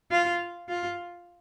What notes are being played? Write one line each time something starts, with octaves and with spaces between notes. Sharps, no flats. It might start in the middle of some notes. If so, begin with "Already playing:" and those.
F4
F4